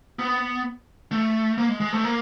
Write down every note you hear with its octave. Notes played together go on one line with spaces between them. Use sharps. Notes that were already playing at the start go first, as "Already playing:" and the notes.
B3
A3
A#3
G#3
G#3
A3
A#3